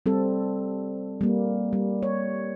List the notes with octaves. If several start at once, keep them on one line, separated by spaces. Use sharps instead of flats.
G3 C4 A4
G3 A#3
G3
C#5